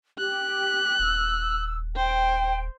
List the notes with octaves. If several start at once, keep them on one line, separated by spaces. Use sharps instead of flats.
G4 F#6
D#1 E6
C5 G5